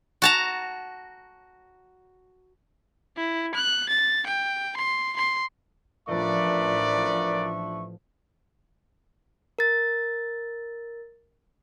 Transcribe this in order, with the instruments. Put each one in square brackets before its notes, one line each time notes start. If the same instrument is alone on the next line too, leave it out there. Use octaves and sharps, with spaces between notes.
[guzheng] F#4 A5 A#5
[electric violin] E4
F#6
A6
G5
C6
C6
[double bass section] A1 F3 [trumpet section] D4 E5 C#6 [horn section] A#4 B4 D5
[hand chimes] A#4 A6